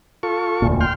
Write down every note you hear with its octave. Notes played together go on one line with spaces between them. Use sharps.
F4 A4 C#6
E1 D2 A#2
G5 C6 F6